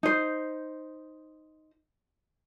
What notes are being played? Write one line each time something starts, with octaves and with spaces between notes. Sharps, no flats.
D#4 C5